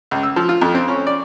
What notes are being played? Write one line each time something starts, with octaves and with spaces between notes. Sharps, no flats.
C#2
E6
F3
F4
F2
C4
C#4
D5